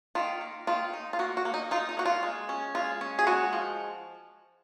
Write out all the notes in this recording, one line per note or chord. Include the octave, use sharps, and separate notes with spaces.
D#3 F4
A#3
D#3 F4
D#4
F4
A#3 F#4
F#4
A#3
D#4
D#4 F4
D#4
A#3 F#4
F4
G#3
C#4
G#3 F4
C#4
G#4
G#3 F#4
F3